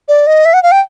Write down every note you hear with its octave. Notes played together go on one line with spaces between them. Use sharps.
D5
D#5
E5
F#5
F5
G5